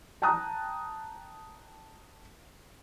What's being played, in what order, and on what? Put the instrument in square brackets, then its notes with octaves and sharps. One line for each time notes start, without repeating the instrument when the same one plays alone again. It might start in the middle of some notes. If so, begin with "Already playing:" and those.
[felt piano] G5 A5 A#5 D#6 F#6